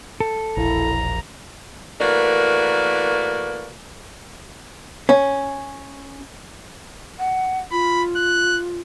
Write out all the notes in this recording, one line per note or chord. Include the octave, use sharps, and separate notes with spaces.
A4
E1 A#1 E4 A#5
E3 A3 A#3 F#4 A#4 D5
C#4
F#5
F4 B5
F#6